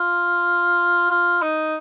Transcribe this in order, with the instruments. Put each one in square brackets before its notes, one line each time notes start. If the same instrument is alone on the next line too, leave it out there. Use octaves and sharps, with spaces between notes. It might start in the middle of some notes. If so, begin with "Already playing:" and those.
Already playing: [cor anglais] F4
F4
D#4